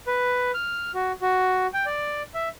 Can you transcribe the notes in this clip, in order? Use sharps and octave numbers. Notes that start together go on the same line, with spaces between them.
B4
F6
F#4
F#4
G5
D5
E5